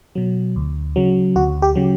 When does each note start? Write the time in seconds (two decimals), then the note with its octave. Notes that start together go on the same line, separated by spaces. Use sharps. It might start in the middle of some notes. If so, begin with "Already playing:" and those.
0.15 B2 F#3
0.56 D2
0.96 C#3 F#3
1.36 D2 F#4
1.62 G4
1.75 C#3 F#3